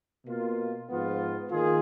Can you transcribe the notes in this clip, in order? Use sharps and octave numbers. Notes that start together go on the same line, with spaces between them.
B2 A#3 F4
G#2 F3 B3 F4
D#3 A#3 F4 G#4